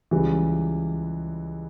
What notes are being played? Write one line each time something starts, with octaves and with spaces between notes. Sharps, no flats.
C#2 C#3 E3 G3